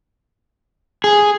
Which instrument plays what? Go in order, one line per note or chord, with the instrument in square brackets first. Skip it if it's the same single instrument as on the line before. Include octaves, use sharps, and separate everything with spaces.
[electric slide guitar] G#4